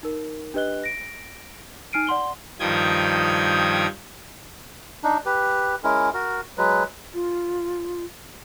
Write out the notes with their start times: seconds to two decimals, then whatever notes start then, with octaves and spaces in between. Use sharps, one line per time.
0.03 D#4 A#4
0.54 D4 G4 B4 D#5 F#6 G7
0.84 A#6 D7
1.93 D#4 G#5 F6 C7 D7 D#7
2.07 D5 F#5 C6 G7
2.60 G2 D#3 F3 G5 D#6 G#6
5.04 D4 D#4
5.26 G4 B4
5.84 G#3 C#4 E4 A#4
6.14 F#4 A#4
6.57 F#3 G#3 B4
7.14 F4